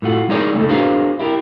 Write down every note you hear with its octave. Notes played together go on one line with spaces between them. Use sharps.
A2 A3 F4 F#4
G#3 D#4 G#4 A#4 C#5 D5
C#2 A3 C#4 D#4 A4
D4 F#4 G#4 A#4 C5 F5
E4 G4 A#4